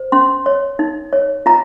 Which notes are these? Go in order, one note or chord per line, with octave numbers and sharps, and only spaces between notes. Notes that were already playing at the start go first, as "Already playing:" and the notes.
Already playing: C5
C#4 C6
C#5
D#4
C#5
F4 A#5